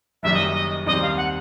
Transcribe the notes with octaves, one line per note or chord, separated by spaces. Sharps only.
F#1 F#2 D#3 G3 E5
D#5
D#5
D#2 D#3 G3 C4 D#5
F5
F#5